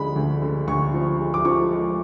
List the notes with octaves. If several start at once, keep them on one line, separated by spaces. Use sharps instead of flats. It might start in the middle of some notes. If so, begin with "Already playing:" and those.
Already playing: D2 D3 F3 G#3 B5
D2
D3
D2 C#6
F3
G#3
D6
F3 C#6
G#3